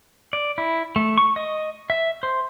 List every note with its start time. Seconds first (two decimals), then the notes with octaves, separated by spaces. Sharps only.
0.33 D5
0.58 E4
0.96 A3
1.18 C#6
1.36 D#5
1.90 E5
2.23 C5